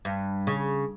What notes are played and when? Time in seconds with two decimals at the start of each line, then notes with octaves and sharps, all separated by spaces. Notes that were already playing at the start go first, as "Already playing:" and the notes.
0.05 G2
0.47 C#3